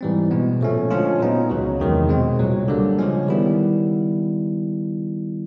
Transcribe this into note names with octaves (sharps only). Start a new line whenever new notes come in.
G#2 E3 G3 C4
B2 G#3 B3
A#2 F3 A3 C#4
D3 F3 G#3 C#4 F4
A#2 F#3 B3 D#4
C#2 C#3 F#3
E2 C3 D#3 G#3
B2 G#3 C4
C2 A#2 F#3
D3 G3 A#3
C#3 F3 G#3 C#4
D#3 G3 B3 E4